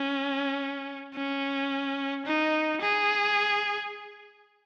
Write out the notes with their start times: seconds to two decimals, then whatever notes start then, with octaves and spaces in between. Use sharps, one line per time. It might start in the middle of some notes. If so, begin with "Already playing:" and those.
Already playing: C#4
1.14 C#4
2.25 D#4
2.81 G#4